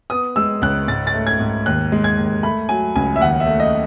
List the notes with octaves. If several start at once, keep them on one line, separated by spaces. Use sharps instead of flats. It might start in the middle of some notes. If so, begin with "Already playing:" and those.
B3 D#6
G#3 E6
C#2 F#6
G#2 A6
A6
A3
G#6
G#2
D#2 F#6
G#3
G#6
D#2
A3 B5
F#3 G#5
C#2 G#5
E5
D#2 F#5
E5
A3
D#5